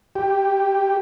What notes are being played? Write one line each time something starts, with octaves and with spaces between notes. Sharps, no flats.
G4